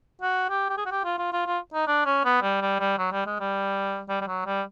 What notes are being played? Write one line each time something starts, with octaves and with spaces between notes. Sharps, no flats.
F#4
G4
G4
G#4
F#4
G4
F4
F4
F4
F4
D#4
D4
C#4
B3
G3
G3
G3
F#3
G3
G#3
G3
G3
G3
F#3
G3